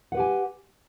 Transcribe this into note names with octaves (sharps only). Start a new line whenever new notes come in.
G4 B4 F#5 G#5